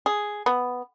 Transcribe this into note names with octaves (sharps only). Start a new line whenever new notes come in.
G#4
B3